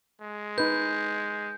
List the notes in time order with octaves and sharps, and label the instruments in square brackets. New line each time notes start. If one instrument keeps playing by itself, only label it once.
[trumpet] G#3
[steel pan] D#4 B4 [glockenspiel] G6